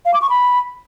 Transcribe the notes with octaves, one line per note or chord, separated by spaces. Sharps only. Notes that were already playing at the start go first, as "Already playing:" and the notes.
F5
D6
C#6
B5